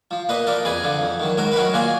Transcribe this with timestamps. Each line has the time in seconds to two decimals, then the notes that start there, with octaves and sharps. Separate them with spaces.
0.11 F3
0.29 A#2 B4 D#5
0.47 F3 A#4 D5
0.65 F2 G#4 B4
0.84 D3 F3
1.02 F2
1.20 D#3 F#3
1.37 G#2 F#4 A#4
1.52 B4
1.56 D#3 F#3 F#4 A#4
1.74 A#2 F4 G#4